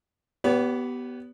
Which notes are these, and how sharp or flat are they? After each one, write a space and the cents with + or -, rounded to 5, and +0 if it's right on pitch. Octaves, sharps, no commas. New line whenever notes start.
B3 +0 G4 -25 C#5 +45